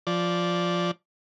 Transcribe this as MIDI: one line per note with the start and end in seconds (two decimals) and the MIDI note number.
0.07 0.91 53
0.07 0.91 74